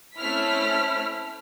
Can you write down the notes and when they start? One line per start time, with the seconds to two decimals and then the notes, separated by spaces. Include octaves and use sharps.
0.17 A3 C4 C#4 E4 F6 B6